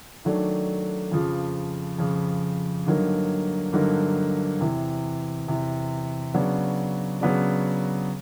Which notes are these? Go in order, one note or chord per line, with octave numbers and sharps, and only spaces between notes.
D#3 F#3 A3 D4
F2 C#3 F3
F2 C#3 F3
G2 D3 F#3 A#3 D#4
G2 D3 F#3 A#3 D#4
E2 C3 E3
E2 C3 E3
C#3 F#3 B3 D4
C#3 F#3 B3 D4